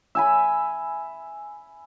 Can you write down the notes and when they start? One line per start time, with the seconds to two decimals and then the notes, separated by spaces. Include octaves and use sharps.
0.15 E5 G#5 B5